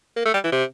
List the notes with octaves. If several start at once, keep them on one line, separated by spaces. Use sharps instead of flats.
A#3
A3
G3
E3
C3